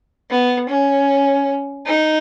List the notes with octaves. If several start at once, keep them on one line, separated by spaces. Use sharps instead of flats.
B3
C#4
D#4